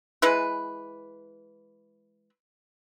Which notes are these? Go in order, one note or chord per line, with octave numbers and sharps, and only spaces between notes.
E3 G#3 E4 B4